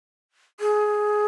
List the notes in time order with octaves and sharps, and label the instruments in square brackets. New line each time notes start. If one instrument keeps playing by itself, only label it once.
[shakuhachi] G#4